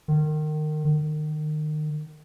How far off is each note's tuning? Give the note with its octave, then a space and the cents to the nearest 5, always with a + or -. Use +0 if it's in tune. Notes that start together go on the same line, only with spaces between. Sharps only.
D#3 -25
D#3 -30